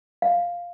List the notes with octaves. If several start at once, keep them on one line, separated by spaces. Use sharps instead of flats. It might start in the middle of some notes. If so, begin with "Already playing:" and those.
F5